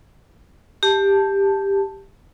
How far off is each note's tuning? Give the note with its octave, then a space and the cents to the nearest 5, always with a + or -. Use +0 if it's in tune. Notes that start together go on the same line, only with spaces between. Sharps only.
G4 +10 A5 +0